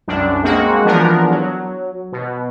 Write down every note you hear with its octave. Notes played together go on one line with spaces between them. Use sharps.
C2 F#2 D4
G#3 A#3 C4 F#4
E3 F3 B3 D4 A#4
F#3
B2